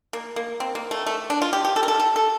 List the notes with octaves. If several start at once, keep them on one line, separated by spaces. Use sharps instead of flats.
A#3
A#3
C4
A#3
A3
A3
D4
F4
G4
G4
A4
A#4
A4
A4
A4